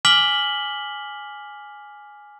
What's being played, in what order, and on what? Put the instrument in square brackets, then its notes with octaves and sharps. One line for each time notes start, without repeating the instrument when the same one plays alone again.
[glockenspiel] G#5 D6 F6 B6 F#7 G7